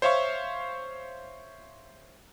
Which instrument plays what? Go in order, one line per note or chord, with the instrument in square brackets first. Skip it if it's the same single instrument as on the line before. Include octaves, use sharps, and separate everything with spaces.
[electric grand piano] C5 C#5 E5 F5 C#6